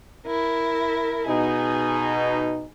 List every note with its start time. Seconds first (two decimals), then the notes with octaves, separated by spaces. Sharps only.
0.25 E4 A#4
1.28 B2 D#4 G#4